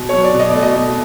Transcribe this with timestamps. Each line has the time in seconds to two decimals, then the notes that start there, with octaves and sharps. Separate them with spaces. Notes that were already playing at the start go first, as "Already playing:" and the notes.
Already playing: B2
0.09 F#3 C#5
0.24 D5
0.34 B2
0.39 D#5
0.50 A3 D5
0.62 D#5
0.75 B2